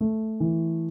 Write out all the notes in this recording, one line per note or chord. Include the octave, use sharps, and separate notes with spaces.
A3
E3